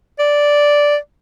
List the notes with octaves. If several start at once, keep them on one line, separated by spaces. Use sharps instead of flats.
D5